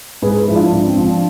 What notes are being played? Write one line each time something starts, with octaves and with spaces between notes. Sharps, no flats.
G#2 G#4 B4
G#4 B4
F3 E4
D4 F4
G#2 D4
C4
F3 D4